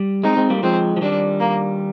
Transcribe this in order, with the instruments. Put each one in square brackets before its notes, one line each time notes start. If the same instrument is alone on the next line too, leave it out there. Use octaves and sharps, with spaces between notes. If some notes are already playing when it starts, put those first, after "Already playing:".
Already playing: [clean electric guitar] G3
[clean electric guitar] G#3 C4 [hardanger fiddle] D#4
[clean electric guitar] G#3 C4
G3 A#3
[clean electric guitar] F3 G#3 [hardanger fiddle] C4
[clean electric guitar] F3
[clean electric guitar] D#3 G3 [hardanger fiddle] D4
[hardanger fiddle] A#3